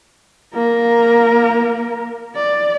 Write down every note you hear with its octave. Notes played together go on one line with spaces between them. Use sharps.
A#3 A#4
D5